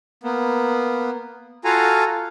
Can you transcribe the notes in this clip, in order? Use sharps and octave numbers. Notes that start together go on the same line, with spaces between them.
A#3 B3
F4 F#4 A4 F5 G#5 A#5